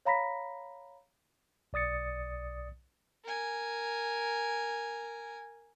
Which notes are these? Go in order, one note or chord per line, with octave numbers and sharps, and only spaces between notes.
C#5 F5 A#5 B5 A#6 B6
B1 D5 D#6 A6 C#7
A#4 G#5